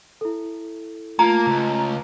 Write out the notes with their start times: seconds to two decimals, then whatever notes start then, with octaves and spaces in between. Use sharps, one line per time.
0.21 E4 A4
1.19 A3 A#3 F4 A#5
1.47 C#2